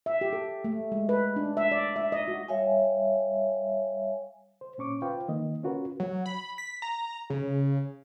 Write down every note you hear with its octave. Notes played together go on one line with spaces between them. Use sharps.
E5
G4
A4
A3
G#3
B4
D4
E5
D5
E5
D#5
F#4
G3 C#5 E5 F5 G#5
C5
A#2 C#4 C#6 D6
F4 B4 C5 F5 G5
D#3 A#3 D#5
C#4 F4 F#4 A#4 B4
F#3
B5
B6
A#5
C#3